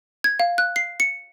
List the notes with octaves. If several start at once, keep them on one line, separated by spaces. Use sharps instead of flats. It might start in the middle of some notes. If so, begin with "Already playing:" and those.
G#6
F5
F#6
C7
C#7